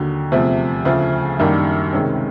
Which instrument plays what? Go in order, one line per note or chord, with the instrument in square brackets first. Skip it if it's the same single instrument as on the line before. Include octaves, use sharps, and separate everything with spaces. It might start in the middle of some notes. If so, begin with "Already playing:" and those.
Already playing: [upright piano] D#2 D3 F#3
E2 C3 F3 A3
D2 C#3 F3 A3
F#2 D#3 G3 A#3 D4
C#2 C3 D#3 G#3 C#4